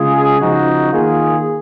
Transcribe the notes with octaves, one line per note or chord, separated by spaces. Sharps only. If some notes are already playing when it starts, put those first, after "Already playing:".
Already playing: C#3 G#3 F4 G#4
C#3 F3 G#3 D#4 F#4
D#3 A#3 F4 G#4